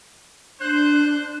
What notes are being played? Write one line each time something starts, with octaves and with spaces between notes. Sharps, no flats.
D4 C5 F#6